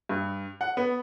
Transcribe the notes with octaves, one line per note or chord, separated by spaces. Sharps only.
G2
F#5
B3